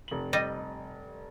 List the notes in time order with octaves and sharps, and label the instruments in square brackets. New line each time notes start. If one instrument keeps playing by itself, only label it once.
[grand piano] F1 F#7
[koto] G3 [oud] D#5